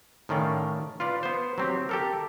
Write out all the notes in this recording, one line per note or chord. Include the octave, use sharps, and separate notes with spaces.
A2 D#3 C#4 D5 F5
F4 B4 D5
B3 C5
F#3 C4 G4
G4 A4 A#4